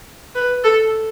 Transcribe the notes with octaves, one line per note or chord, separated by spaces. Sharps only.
B4
A4